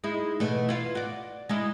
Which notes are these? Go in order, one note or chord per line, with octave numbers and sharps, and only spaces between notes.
G#3 D#4 E4
B2 E3 A3
E4 F4
F#4 D5
G#3 D#4 E4